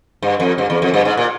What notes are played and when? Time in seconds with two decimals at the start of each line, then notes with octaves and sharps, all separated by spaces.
0.23 G2
0.40 F2
0.58 G2
0.70 E2
0.82 F2
0.94 G2
1.05 G#2
1.17 A#2